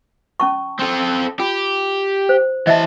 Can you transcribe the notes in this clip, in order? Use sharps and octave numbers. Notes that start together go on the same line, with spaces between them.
C#4 A5 C#6
C4 A4
F4 G4
C5
E3 D#5 E5 A5